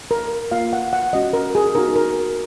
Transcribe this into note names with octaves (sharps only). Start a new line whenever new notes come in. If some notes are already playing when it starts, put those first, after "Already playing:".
A#4
A#3 F4 F5
F#5
F#5
G#3 C#4 F#4 D#5
A#4
G#4
B3 D#4 F#4 A#4
A#4